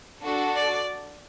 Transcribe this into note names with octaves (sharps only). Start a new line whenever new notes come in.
D4 F#4 A4
D5